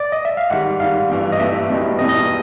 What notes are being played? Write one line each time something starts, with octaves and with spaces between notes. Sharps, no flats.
D5
D#5
E5
F5
G#2 D#3 G3 F#5
G#2 D#3 G3 F5
G1 G2 E3 G3
D#5
G1 G2 E3 G3 E5
E1 E2 B2 G3
E1 E2 B2 G3 D#5
D#5